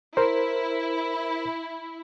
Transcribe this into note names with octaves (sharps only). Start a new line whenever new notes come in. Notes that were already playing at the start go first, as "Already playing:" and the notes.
E4 A#4 C5